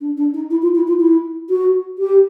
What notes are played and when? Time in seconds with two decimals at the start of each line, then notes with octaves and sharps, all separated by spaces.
0.01 D4
0.17 D4
0.34 D#4
0.50 E4
0.62 F4
0.75 E4
0.87 F4
1.00 E4
1.49 F#4
1.98 G4